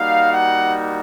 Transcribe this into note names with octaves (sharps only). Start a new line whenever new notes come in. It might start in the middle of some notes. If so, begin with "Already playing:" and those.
Already playing: G3 A#3 D#4 F#4 F5
F#5